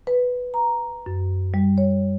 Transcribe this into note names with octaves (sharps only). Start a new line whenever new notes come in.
B4
A#5
F#2
G3
C#5